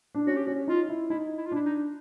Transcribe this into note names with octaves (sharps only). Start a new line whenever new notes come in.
D4
C#4 F#4
G4
C#4 F#4
D#4 F4
E4
D#4 E4
E4
F4
D4 E4
D#4